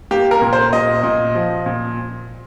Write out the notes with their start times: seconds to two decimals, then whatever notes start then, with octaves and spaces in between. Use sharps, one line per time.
0.11 A#3 G4
0.31 A#4
0.42 A#2
0.53 C5
0.73 A#2 D#5
1.03 A#2
1.35 F3
1.66 A#2